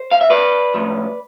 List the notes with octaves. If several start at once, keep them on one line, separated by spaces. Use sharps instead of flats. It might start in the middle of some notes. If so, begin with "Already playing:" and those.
Already playing: C5
F5
E5
B4 D5
A2 F3